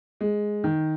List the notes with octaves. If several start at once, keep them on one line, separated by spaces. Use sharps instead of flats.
G#3
D#3